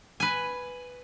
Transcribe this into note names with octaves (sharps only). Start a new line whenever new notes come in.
B4 G#5